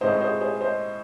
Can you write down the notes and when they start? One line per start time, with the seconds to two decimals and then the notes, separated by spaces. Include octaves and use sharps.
0.01 A2 G#3 C4 D#4 C5 D#5
0.21 G#4 C5
0.41 G#4 C5
0.61 C5 D#5